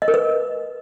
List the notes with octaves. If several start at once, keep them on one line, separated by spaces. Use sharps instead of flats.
D#5
A#4
B4